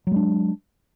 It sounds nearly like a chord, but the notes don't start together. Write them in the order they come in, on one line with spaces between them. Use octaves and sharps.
F#3 G#3 D4